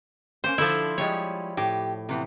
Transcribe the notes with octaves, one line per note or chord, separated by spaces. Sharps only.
G3 A#3 C#4 C5
D3 F3 D4 E4 A4
F3 G3 G#3 C#5
A2 G4
C3 E3 B3